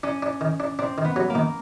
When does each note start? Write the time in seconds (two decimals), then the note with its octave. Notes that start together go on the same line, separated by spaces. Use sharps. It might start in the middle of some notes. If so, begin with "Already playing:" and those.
0.03 C#4 D4
0.22 D4
0.41 D#3
0.60 D4
0.79 C4 D4
0.98 D#3
1.05 B3
1.16 F#3
1.30 A#3
1.35 D#3